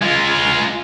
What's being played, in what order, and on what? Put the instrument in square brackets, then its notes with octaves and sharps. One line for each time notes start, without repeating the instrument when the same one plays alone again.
[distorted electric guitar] G#3 F4